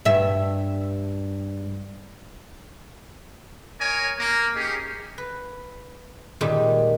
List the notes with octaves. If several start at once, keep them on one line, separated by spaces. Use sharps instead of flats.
G2 E5
A#4 C#5 D#5 G#5
A#3 A#4
C#4 D#4 G4 G#4
B4
A#2 D#3 G3 G#3